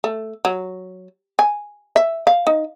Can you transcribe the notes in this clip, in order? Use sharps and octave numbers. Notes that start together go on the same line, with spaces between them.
A3
F#3
G#5
E5
F5
D#4